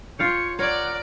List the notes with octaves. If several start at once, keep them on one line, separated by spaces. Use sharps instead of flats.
F4 C#5 F5 G5 C#7
A#4 C#5 D5 F#5